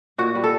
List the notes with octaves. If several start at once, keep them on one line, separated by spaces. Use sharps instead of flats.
A#2 F#4
G3
A4